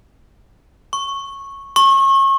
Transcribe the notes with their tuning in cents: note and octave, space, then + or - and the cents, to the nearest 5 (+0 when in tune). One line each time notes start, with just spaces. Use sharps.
C#6 -10
C#6 -35